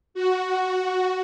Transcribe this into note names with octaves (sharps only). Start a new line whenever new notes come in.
F#4